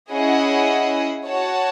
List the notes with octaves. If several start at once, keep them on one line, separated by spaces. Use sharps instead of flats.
C#4 E4 G#4 D#5 F#5
F#4 C#5 F#5 A5